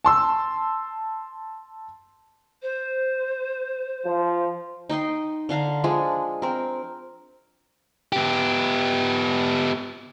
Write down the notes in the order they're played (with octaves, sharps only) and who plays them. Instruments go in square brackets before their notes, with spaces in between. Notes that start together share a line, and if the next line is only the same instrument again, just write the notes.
[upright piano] A5 C6 E6
[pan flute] C5
[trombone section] F3
[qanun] D#4 D#5 G5 C6
D3 D4 F5 A#5
F3 G#3 D4 G#4
C4 A#4
[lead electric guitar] B3 G4